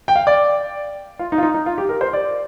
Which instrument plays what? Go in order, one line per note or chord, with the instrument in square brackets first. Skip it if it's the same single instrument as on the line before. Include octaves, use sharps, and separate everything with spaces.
[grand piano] G5
F5
D5
F4
D#4
F4
D#4
D#4
F4
G4
A#4
C5
D5